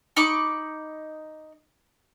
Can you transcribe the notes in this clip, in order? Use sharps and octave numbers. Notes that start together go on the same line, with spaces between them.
D#4 B5 C#6 D6